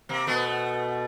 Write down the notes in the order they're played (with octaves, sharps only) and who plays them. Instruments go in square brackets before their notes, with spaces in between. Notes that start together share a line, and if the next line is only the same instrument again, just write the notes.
[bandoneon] C3 [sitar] A#3 C4
[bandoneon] B2 [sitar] A3 B3